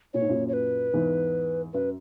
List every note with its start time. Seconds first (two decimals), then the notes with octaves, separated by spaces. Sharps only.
0.14 A#2 C#5
0.21 G#2
0.29 F#2 A#2
0.48 C#5
0.53 B4
0.93 E2 G#2
1.73 F#2 B4